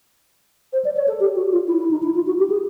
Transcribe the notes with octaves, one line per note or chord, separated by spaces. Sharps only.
C5
D5
C#5
A4
G4
F#4
F4
E4
E4
D#4
E4
F4
F#4
G4
G#4